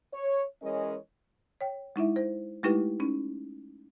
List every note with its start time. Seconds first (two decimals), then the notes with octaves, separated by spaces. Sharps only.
0.13 C#5
0.62 E3 G#3 C#4 A#4 C#5 D#5
1.61 C#5 G5
1.96 G#3 D#4 E4 E5
2.16 C5
2.63 G#3 A3 D#4 E4 G4 B4
3.00 C#4 D#4